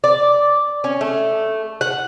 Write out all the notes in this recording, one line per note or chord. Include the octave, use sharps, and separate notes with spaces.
D5
C#4
A3
F#5